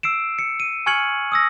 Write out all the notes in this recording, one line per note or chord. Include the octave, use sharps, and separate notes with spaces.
E6 C7 D7 E7
C#7
D#7
G#5 C#6 F6 G#6 C#7 F#7
D#6 E6 A#6